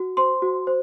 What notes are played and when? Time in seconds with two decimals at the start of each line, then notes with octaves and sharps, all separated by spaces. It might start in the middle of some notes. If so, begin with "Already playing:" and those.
Already playing: F#4
0.17 C5 C6
0.42 F#4
0.67 C5